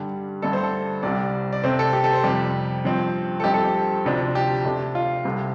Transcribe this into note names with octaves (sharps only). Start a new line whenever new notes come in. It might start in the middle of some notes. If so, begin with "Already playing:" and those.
Already playing: G2 D3 G3
G2 D3 A3 D4 A4
C5
A4
C2 C3 G3 D5
D5
C3 A3 C4 C5
A4
G4
A4
C5
F2 C3 G3 G4
G2 F3 C4
A4
G2 F3 A3 C4 G4
A4
G4
D2 C3 F3 D4
G4
C3 A3 D4
F4
C2 C3 A3